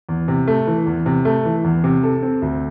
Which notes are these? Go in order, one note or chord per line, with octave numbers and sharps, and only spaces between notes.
E2
C3
A3
E3
E2
C3
A3
E3
E2
C3
A4
C4
D2